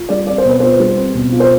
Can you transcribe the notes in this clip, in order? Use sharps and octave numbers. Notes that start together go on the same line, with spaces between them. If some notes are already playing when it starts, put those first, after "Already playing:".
Already playing: F4
G3 D5
C4 D5
C5
B2 B4
F4 C5
G3
C4
B2
F4
C5